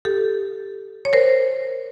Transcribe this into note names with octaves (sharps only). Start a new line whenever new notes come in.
G4 A4
C#5
A#4 C5